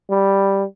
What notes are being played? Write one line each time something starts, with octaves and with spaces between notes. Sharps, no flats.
G3